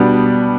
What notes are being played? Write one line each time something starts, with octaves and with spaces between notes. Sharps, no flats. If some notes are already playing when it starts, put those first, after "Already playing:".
Already playing: B2 G3 B3 D4